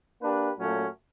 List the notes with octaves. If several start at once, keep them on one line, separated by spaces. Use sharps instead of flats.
A#3 D4 G4 B4
A#2 F#3 A3 C#4